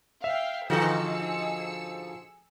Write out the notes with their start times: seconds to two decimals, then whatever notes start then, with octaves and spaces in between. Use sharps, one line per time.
0.24 E5 F5 G5
0.70 G#2 D3 F3 F#4 G#4 A4 E6 C#7